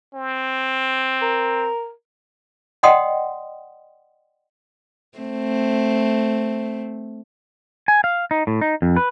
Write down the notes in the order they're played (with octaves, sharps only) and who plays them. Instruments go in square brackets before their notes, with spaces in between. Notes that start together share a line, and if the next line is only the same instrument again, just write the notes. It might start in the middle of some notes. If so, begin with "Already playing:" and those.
[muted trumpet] C4
[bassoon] A#4
[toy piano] D5 D#5 F#5 G5 C6 D#6
[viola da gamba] A3 C4
[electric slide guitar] G#5
F5
D#4
A2
D#4
F2
B4